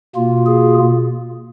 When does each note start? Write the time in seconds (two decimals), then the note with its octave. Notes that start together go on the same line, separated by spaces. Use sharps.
0.16 B2 A#3 F4
0.47 G#4